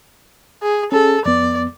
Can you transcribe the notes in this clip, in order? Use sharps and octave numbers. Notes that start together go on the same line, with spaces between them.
G#4
C#4 G#4 A4
F2 B3 D5